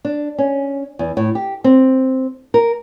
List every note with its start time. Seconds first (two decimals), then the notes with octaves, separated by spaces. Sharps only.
0.05 D4
0.38 C#4
0.99 E2
1.17 A2
1.35 G4
1.64 C4
2.54 A#4